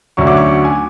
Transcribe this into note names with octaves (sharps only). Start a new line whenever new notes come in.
D2 D3 F#3 C#4 C#6
D6
C#6
G#5